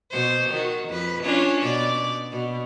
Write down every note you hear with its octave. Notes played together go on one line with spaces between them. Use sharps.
B2 C5
D#3 F#4
F2 B4
C#4 D4 F4
B2 D5
B2